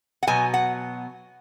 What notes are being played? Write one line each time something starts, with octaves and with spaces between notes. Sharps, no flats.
F#5
B2 F#3 B3 G#5
F#5